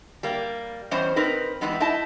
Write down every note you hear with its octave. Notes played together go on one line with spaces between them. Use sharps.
G3 A#3
E2 G3 C#4 C5 D#5
C4 D#4 A#4 B4
E3 G3 G#3 B3 D#4
D#4 E4 D#5 A5